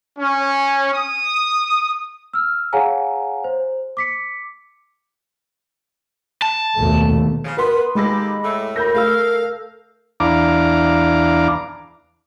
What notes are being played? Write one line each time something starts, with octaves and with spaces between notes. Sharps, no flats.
C#4
D#6
E6 F6
G#4 C#5 F5 F#5 G#5 A#5
C5
D6 B6 C#7
A5
D#2 B2 A3
C#3 F3
B3 A#4 B4 C6
D#2 G#3 G4 A4 B5 D6 A#6
A2 A3
A#4 B5 G6 A#6
A3 A4 F5 E6
E2 D4 F5 A#5 D6